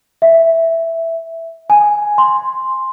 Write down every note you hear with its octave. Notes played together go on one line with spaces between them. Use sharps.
E5
G#5
C6